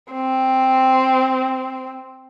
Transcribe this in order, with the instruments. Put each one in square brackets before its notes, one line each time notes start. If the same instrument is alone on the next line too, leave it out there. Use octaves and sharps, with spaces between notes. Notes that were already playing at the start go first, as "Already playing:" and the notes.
[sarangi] C4